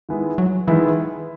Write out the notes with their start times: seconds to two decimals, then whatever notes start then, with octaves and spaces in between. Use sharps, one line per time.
0.09 D#3 G#3 B3 E4
0.38 F#3
0.67 D#3 E3 G#3 B3 E4